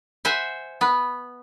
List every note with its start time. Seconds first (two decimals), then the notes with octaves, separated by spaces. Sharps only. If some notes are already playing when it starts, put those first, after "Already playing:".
0.25 C5 E5 F#5 G#5
0.81 B3 B4